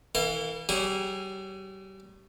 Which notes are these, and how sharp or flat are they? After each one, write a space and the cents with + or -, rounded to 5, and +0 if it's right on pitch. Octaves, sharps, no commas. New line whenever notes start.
E3 -20 A4 +45 F5 +20
G3 -35 C#4 +0 G#4 -30